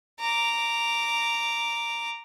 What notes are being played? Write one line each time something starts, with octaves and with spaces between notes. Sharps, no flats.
A#5 D6